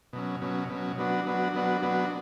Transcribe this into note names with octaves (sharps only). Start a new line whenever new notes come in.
B2 F#3 C#4
B2 F#3 C#4
B2 F#3 C#4
F#3 B3 D4 F#4
F#3 B3 D4 F#4
F#3 B3 D4 F#4
F#3 B3 D4 F#4